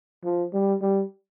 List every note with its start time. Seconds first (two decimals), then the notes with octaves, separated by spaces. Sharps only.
0.24 F3
0.53 G3
0.82 G3